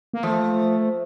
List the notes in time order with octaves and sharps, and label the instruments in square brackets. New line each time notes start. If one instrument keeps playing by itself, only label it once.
[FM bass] A#3
[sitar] F3 [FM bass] A3